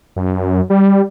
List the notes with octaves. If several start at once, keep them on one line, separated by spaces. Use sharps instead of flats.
F#2
G3